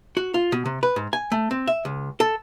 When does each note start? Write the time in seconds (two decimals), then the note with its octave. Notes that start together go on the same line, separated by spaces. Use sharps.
0.17 F#4
0.34 F4
0.52 B2
0.66 C3
0.83 B4
0.96 G#2
1.13 G#5
1.32 A3
1.51 C4
1.67 E5
1.85 C#2
2.20 A4